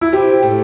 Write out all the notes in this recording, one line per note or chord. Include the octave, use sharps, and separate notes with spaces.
E4
C3 C4 G4
A2 A3